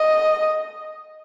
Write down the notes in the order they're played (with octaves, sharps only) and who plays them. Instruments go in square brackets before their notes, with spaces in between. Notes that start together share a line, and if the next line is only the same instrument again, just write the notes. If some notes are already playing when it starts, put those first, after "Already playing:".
Already playing: [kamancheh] D#5